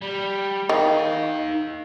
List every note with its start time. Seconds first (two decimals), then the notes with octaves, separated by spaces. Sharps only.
0.02 G3
0.69 D#3 D#4 F5